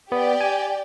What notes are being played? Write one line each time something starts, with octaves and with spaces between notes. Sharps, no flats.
B3 G4 D5 G5
G#5